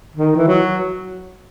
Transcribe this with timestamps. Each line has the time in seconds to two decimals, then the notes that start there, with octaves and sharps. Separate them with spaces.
0.16 D#3
0.36 E3
0.48 F#3